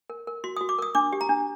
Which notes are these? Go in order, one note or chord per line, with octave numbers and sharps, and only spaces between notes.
A#4
A#4
F#4 C6
F#4 D#6
D6
A#4 D#6
D4 D6
G4
A#5
D4